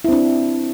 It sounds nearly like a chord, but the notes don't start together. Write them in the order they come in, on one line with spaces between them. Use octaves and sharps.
E4 C4 D4